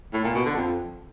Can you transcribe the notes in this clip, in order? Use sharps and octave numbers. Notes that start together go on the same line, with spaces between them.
A2
A#2
B2
D3
F2